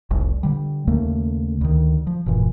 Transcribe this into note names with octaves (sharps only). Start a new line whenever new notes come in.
F1 C2
D3 G3
D#2 C#3 A3 A#3
D2 D#3
F3
E1 G2 A#2 E3